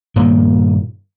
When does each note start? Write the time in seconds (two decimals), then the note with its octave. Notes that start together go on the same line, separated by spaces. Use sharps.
0.16 G2 A#2 D#3 A#3